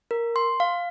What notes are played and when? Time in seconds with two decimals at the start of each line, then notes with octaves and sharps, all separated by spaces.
0.11 A#4
0.36 C6
0.60 F5